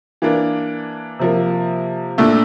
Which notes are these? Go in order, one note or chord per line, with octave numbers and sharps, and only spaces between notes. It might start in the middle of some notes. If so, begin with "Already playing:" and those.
E3 A#3 D4
C3 F3 A#3
A#2 A3 D4